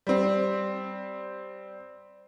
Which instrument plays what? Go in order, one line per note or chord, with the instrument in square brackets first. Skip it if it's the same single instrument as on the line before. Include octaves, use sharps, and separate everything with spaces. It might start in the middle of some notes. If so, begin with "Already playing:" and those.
[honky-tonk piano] G3 C4